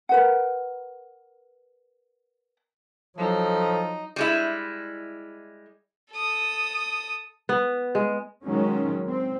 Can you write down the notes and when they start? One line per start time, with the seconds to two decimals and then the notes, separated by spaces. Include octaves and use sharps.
0.09 A#4 B4 F#5
3.18 F3 F#3 D#4 A4
4.16 G3 G#3 E4
6.12 A4 D#6
7.49 B3
7.95 G#3
8.45 D#3 F#3 G#3 C#4
9.07 C4